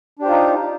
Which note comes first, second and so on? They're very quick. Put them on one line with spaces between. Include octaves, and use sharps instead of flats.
D4 G4 C5 F4 D#4